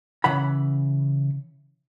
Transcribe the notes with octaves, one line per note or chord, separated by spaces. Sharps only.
C#3 E3 F#5 B5